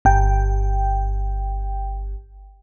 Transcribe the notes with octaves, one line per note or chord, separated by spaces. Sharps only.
G1 G5